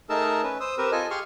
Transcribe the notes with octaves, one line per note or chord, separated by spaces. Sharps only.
A3 D#4 G#4 A#4 A5 E6
C#4 B4
C5 D#6 E6
C4 G4 A#4 B4 E6
F4 A4 D#5 G#5
G4 G#4 F5 C6 C#6 F6